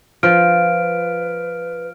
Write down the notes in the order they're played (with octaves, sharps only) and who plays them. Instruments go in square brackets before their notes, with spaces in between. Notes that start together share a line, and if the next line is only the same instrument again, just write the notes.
[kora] F3 [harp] F4 C5 F5 [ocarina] B4 [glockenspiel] F6 D7